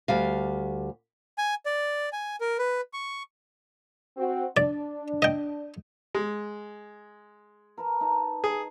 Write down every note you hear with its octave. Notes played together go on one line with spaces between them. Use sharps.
D2 G3 F5
G#5
D5
G#5
A#4
B4
C#6
C4 F#4
D4 D5
D#5 G5
G#3
A#4 B4 A5
D#4 A5
G#4